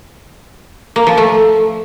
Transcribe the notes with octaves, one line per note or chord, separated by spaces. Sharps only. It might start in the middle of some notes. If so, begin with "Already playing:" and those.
A#3
F3
A3